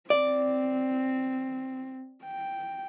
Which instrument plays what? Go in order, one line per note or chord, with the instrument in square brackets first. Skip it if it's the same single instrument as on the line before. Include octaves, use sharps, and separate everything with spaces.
[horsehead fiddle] C4 [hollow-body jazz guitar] D5
[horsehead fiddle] G5